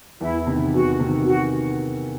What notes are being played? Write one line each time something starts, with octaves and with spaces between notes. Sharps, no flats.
E2 E4
C3 D#3
E2 F#4
C3 D#3
F#4